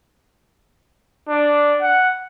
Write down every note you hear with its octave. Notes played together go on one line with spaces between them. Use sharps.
D4
F#5